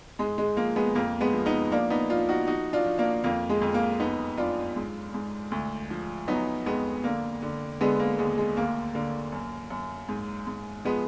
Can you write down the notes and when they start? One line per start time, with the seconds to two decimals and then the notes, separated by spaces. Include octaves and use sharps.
0.19 G#2 G#3
0.38 G#3
0.57 F3 A#3
0.76 G#3 B3
0.95 F2 A#3
1.20 G#3 B3
1.33 F3
1.46 B3 D#4
1.71 F3 A#3 D4
1.90 B3 D#4
2.09 F3 D4 F4
2.29 D#4 F#4
2.47 F3 D#4 F#4
2.73 D4 F4
2.86 F3
2.98 A#3 D4
3.24 F2 A#3
3.49 G#3
3.62 F2
3.74 A#3
4.00 F#2 B3 D#4
4.37 F#2 D4 F4
4.76 G#2
5.14 G#2
5.51 D2
5.90 F3
6.28 F#3 B3 D#4
6.66 F2 G#3 B3
7.04 D3 A#3
7.42 D3
7.81 D3 G#3 B3
7.99 A#3
8.19 D#2 G#3
8.38 G#3
8.57 D2 A#3
8.95 D3 A#3
9.32 F#2
9.70 F#2
10.09 G#2
10.47 G#2
10.85 F3 G#3 B3